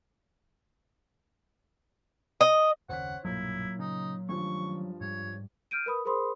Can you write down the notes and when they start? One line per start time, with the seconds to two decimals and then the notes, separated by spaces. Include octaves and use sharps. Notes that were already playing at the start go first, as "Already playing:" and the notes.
2.41 D#5
2.89 F#1 D#2 C#3 C5 C#5 F#5 B6
3.25 B1 G2 A#2 F#3 A#3 E4
3.79 C#3 D#4
4.29 G2 D#3 F3 A3 C#4 C#6
5.01 G#2 G3 C#5
5.71 F6 G6 D7 D#7
5.86 A#4 B4 B5 D#6
6.05 G#4 A#4 C5 B5 C6 D#6